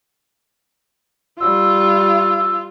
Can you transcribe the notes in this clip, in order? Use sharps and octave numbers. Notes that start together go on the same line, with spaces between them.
G3 F4 E6